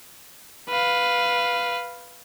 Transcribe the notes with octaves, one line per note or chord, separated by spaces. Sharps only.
B4 F5